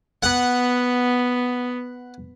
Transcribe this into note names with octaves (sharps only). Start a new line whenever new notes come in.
B3 F#5